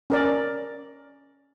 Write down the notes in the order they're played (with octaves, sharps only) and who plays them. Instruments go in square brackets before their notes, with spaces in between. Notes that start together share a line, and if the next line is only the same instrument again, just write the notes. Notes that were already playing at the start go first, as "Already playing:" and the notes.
[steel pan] C#4 A#4 D5